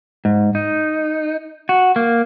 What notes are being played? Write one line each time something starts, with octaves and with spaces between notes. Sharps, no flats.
G#2
D#4
F#4
A#3